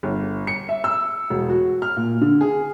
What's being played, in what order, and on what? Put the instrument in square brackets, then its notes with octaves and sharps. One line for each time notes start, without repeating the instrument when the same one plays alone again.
[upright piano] G1
C#7
E5
E6
E1
F#4
F6
A#2
D3
G#4